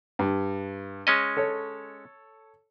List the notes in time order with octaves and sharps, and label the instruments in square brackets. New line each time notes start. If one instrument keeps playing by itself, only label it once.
[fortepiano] G2
[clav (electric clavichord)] G#3 C#4 D#5
[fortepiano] A4 C#5